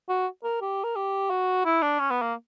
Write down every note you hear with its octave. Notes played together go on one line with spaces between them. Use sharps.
F#4
A#4
G4
A#4
G4
F#4
E4
D4
C#4
B3
A#3